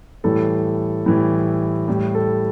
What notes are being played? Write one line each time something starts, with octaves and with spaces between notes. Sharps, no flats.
A2 E3 G3 A4
A2 E3 G3
A2 G3
A4